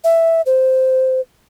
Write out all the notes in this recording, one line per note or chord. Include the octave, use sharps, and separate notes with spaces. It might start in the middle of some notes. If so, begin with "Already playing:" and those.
E5
C5